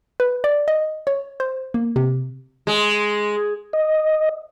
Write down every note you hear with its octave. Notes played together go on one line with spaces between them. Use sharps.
B4
D5
D#5
C#5
C5
A#3
C3
G#3
D#5